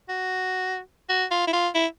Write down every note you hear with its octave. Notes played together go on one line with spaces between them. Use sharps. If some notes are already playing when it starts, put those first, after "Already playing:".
F#4
F#4
F4
E4
F4
E4